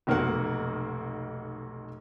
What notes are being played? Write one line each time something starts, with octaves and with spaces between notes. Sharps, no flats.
F1 B1 A#3 F#4 A#4 F#5